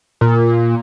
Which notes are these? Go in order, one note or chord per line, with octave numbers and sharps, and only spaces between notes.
A#2